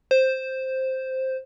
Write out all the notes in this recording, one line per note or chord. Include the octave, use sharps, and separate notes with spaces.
C5